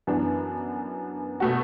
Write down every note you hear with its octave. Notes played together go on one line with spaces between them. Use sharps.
F#2 E3 B3 D4
B2 A3 F#4